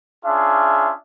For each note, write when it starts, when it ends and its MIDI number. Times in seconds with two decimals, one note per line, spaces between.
0.24 0.92 61
0.24 0.92 62
0.24 0.92 65
0.24 0.92 68
0.24 0.92 76